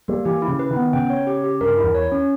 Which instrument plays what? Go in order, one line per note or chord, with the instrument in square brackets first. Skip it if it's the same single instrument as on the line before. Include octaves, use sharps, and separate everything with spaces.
[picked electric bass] G3 [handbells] A#3
[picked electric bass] E3 [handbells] G4
[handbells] E4
[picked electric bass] C#3
[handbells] B4
[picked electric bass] D#3
[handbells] B3
[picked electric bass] C#3 [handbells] G5
[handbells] C#5
G4
G4
[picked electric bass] G2 [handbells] A#4
[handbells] E4
[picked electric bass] E2
[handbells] C#5
C#4